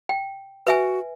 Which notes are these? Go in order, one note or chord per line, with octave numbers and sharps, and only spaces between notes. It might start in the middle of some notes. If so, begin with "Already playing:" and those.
G5
F#4 B4 E5 G#5